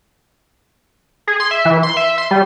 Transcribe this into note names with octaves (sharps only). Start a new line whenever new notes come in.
G#4
C6
E5
E3
C6
E5
C6
G3